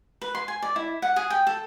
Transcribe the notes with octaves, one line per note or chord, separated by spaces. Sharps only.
B4
C6
G#5
D5
E4
F#5
G#4
G5
A4